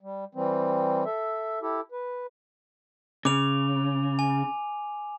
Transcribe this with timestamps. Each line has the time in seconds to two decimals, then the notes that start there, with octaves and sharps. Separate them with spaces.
0.01 G3
0.35 E3 G3 C4
1.05 A4 E5
1.62 E4 G4 A4
1.92 B4
3.25 C#3 D6 F7
4.19 G#5